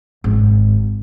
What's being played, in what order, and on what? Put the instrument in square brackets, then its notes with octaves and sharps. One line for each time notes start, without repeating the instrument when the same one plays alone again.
[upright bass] G#1